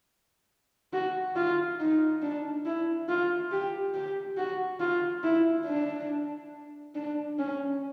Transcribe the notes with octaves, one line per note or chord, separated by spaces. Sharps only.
F#4
F4
D#4
D4
E4
F4
G4
G4
F#4
F4
E4
D4
D4
C#4